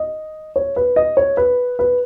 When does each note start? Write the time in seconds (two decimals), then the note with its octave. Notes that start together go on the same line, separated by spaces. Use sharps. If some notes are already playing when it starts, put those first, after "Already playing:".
Already playing: D#5
0.56 C#5
0.76 B4
0.96 D#5
1.17 C#5
1.37 B4
1.79 B4